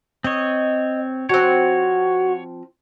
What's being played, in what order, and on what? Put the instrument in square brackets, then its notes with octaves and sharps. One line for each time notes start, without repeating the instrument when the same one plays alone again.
[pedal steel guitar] C4 C#5 [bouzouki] D#5
[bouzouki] F3 C4 [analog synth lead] F#4 [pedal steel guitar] C#5